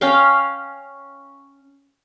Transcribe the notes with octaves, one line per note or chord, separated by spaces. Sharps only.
C#4 F5 G5